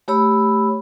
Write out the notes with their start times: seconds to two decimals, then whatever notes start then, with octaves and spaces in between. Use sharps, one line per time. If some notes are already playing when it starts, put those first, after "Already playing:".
0.08 A3 G4 C#5 B5 E6